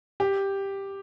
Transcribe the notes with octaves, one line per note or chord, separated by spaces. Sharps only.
G4